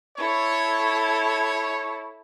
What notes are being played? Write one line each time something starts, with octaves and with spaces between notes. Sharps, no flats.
E4 A4 C#5